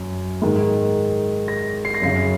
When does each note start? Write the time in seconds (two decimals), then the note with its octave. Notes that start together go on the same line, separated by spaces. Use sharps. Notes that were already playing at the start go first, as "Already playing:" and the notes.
Already playing: F#2
0.42 G#2 D#3
1.48 A#6
1.85 C7
1.94 A#6
2.02 F#2 C#3 C7